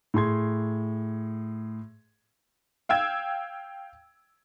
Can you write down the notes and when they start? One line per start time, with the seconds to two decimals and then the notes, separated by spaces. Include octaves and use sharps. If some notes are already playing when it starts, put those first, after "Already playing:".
0.14 A2 G#4 C6 G#6
2.89 F5 G5 E6 G#6